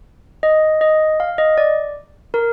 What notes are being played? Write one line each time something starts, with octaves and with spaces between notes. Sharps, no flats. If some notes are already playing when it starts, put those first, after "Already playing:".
D#5
D#5
F5
D#5
D5
A#4